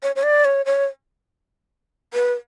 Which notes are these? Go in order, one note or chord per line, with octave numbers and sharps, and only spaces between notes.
C#5
C#5
D5
C#5
C#5
B4